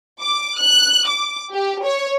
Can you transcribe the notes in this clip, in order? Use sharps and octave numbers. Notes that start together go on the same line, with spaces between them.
D6
F#6
D6
G4
C#5